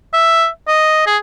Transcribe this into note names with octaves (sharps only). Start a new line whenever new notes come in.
E5
D#5
G#4